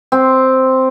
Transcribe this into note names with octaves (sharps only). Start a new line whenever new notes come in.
C4